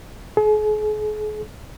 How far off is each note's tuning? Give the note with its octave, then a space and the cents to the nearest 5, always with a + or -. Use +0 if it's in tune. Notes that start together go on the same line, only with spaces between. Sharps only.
G#4 +40